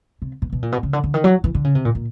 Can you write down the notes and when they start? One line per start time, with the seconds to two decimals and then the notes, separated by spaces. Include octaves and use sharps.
0.22 C3
0.42 B2
0.53 B2
0.62 A#2
0.72 B2
0.83 C#3
0.93 D3
1.04 D3
1.14 D#3
1.24 F#3
1.44 E3
1.55 D3
1.64 C#3
1.75 C3
1.85 A#2
1.95 A#2